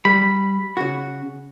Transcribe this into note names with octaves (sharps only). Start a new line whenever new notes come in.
G3 B5
C#3 F#4